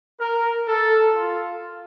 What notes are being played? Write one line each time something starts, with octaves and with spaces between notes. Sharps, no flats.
A#4
A4
F4